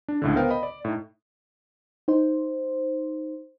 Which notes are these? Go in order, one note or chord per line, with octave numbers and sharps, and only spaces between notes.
D4
C#2 A2 D3
B3 A#4 C5 F5 G5
D#5 B5
D5
A2 D#4
D#4 C5